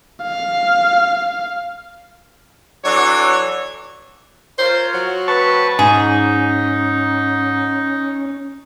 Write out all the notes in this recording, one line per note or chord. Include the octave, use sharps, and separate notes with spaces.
F5
E3 F#3 D4 A4 C#5
F4 A#4 C5 C#5
F#3
C4 B4 A5 C#6
G#2 C#4 D#4 G#4